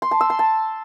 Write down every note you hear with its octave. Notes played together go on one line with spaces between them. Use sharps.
C6
A5
E6
C6
A5